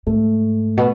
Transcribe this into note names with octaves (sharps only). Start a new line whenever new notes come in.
G#2 A3
B2